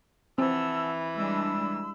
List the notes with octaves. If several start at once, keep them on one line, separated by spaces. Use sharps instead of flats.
E3 C4 F#5 A5 E6
G3 G#3 D4 B5 E6